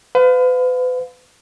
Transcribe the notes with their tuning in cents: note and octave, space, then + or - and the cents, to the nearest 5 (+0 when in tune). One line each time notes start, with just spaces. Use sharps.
B4 +35 F5 +25